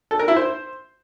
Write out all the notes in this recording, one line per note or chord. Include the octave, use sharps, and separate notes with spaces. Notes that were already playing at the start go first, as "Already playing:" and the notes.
A4
A#4
E4
C5